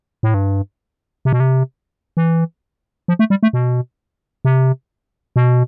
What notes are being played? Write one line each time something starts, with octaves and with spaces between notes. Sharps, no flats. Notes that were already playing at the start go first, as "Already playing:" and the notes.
A2
G2
C3
B2
C3
E3
F3
A3
G3
A3
B2
C3
B2